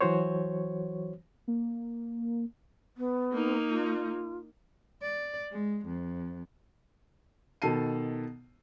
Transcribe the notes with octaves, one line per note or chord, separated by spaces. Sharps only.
E3 F#3 F#4 C5 C#5
A#3
B3
A#3 D#4
F4
D5
G#3
F2
B2 D#3 A4 A5 C7 D#7